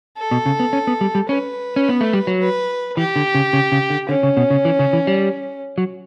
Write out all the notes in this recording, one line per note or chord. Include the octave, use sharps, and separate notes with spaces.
A4
B2
C#3
B3
C#4
B3
G3
G3
C#4 B4
C#4
B3
A3
G3
F#3
B4
E3 G4
D3
C#3
C#3
C#3
D3
D3 C#4
C#3
B2
C#3
E3
C#3
E3
G3
F#3